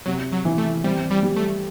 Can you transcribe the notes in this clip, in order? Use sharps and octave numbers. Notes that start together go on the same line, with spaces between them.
C3 F#3
F#3
E3
A3
G3 C4
G3
G3
A3